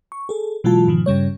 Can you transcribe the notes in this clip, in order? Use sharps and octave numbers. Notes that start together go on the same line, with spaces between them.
C#6
G#4 A4
B2 E3 F#3 G#3 F4 A5
G#2 B2 D#3 F3
G2 C#3 G3 C#5